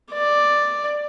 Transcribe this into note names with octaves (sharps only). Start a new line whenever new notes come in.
D5